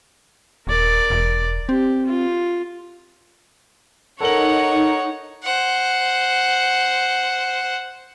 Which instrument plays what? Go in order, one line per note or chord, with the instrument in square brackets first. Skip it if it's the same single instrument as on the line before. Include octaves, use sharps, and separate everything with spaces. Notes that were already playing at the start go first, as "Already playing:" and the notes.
[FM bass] D#1 [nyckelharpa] A#4 D5
[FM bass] E1
[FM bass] C4 [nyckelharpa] G4
[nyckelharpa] F4
[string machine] D#4 [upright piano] A4 A#4 F#7 [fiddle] C#5 F#5
[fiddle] C5 F#5